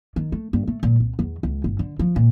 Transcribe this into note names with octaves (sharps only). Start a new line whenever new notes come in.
D#3
A3
G2
A3
A#2
C2
E2
C#2
G1
D3
F3
A#2